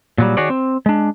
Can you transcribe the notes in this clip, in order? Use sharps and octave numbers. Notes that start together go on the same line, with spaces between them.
A#2 F#3 G3
D#3 F#4 G#4 C#5 D5
C4
G#3 D4